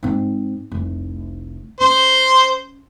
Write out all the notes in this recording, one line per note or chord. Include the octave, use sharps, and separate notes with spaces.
G#2 C4
F1 C2
C#4 C5 C6